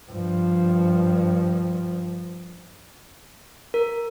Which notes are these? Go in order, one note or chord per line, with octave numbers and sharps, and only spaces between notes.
G2 F3
A#4